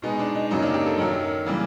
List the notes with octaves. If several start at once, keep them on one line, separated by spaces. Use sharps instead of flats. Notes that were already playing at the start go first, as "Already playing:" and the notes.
B2 G#3 B3 D#4
D4
D#4
F#2 C#3 F#3 A#3 D#4
D4
G4
A4
F#2 D#3 F#3 A#4
C#3 E3 G3 A#3